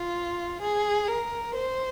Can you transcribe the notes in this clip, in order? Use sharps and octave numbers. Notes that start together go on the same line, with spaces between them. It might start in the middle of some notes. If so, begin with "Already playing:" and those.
Already playing: F4
G#4
A#4
C5